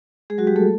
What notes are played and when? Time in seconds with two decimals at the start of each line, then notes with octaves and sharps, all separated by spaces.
0.30 G#3 G#4
0.38 F#3 F#4
0.47 G3 G4
0.56 A3 A4